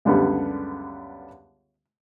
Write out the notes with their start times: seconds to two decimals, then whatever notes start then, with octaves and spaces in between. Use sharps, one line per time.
0.05 C#2 F#2 D3 G3 B3